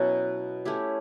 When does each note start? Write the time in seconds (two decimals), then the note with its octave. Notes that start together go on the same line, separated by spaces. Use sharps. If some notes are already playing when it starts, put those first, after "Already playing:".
Already playing: B2 F#3 C#4 E4
0.65 A3 C#4 E4 G4